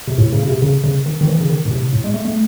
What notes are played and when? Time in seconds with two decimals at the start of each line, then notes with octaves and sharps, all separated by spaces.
0.08 C3
0.18 A2
0.33 C#3
0.43 C#3
0.48 C3
0.62 C#3
0.84 C#3
1.06 D#3
1.21 D#3
1.27 E3
1.40 C#3
1.50 D#3
1.65 A2
1.71 C3
1.93 A2
2.04 G#3
2.14 A3
2.25 A3